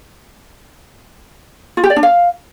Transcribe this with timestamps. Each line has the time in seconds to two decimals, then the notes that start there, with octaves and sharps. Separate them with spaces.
1.77 F4
1.84 G4
1.90 D5
1.96 D4
2.03 F5